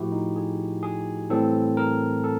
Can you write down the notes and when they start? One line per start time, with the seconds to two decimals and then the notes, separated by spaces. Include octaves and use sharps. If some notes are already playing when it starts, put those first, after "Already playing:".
Already playing: A2 F3 A3 E4 F#4 G4
0.12 D#4
0.36 G#4
0.83 G#4
1.30 A2 E3 G3 C4 A4
1.77 A#4
2.24 A4